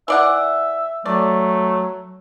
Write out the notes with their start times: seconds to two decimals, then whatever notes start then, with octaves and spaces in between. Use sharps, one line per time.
0.08 E3 D5 E5 F#5
1.06 F#3 A3 D5